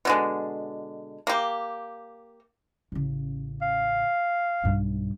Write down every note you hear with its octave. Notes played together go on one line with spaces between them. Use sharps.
B2 D3 G#3
A#3 G4
A1 C#3
F5
B1 G2